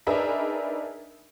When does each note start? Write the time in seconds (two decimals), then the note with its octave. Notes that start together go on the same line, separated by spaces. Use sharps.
0.07 D4 D#4 G#4 A#4 B4 E5